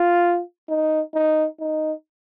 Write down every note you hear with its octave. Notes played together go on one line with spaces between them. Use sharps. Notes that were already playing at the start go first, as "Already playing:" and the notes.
Already playing: F4
D#4
D#4
D#4